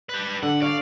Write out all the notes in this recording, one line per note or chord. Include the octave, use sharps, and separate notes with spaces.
G4 B4
D3 F#5
C#5 D5 F5